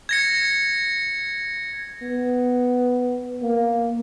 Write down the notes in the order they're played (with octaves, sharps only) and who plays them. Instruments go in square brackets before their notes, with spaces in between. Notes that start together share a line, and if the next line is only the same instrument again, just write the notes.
[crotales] G#6 A#6 C#7
[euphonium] B3
A#3